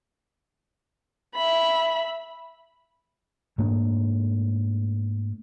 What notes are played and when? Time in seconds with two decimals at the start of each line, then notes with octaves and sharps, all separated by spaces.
1.35 E5 B5
3.58 G#2 A3 A#3 D4